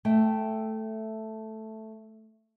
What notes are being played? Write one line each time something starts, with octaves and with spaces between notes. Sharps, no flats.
A3 E5 G5